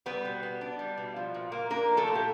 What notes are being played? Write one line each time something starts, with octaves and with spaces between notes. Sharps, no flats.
G3 B3 B4
B2
B3
D4
G3
B2
F3
A#2
A#3
A#3 D4 A#4
F3
A3 A4
A#2
G4